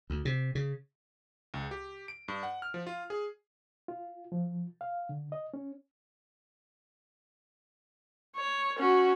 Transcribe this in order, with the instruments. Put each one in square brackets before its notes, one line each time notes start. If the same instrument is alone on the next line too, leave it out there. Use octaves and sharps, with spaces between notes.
[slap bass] D2
C3
C#3
[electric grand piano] C#2
G4
D7
G2
F#5
F6
F3
F4
G#4
[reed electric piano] F4
F3
F5
D3
D#5
C#4
[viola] C#5
C#4 F#4